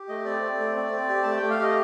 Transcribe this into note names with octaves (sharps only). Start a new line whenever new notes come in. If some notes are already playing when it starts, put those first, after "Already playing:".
Already playing: G4
A3 D#5
C4 D5
C4
A3
C4
C4
G4
A3 A5
G5
A3
F5
G4 D#5